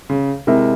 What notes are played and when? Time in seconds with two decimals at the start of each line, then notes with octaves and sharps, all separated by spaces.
0.10 C#3
0.47 C3 G#3 E4 A#4 E5